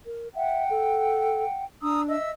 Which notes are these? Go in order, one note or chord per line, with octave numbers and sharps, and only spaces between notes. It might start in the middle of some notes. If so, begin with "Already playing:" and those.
A#4
E5 F#5 G5
A4
D4 A#5 D#6 E6
D#5 E5 E6